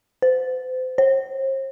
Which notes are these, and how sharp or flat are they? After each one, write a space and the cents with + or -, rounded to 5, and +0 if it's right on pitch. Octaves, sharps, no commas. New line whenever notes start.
C5 -35
C5 +45